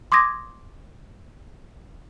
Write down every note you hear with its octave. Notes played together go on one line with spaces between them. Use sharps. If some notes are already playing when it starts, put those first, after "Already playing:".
C6 D6 D#6 G#6 A#6